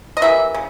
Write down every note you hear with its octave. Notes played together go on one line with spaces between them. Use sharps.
D#5
E3 G3 A#3 E5
C#3